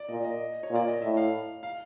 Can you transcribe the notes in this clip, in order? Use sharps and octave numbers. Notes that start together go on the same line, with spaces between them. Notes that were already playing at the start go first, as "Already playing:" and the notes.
Already playing: D5
A#2 D#5
D#5
C#5
A#2
D5
D#5
A2 E5
F5
F5